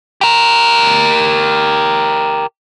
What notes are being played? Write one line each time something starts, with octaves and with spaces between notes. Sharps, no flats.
G4 A#4